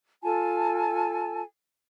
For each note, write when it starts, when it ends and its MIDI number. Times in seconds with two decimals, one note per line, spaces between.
0.23 1.40 65
0.23 1.40 69
0.23 1.40 80
0.23 1.40 81